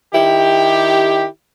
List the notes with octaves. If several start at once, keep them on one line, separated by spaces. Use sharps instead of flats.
D#3 E4 G4